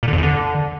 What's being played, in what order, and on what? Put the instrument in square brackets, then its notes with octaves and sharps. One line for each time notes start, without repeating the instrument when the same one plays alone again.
[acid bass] A#2
D3
F2
E2
D3